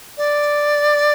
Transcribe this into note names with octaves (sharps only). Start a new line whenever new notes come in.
D5